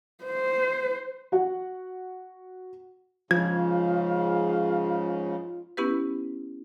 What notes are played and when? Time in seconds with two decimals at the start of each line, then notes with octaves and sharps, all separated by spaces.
0.24 C5
1.32 F#4 F#5
3.31 G#2 C#3 F3 F4 G#6
5.77 B3 C#4 E4 G4 B4